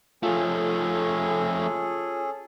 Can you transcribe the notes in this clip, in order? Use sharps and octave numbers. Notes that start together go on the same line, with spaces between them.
F3 A3 C#4 F4 G#4 A4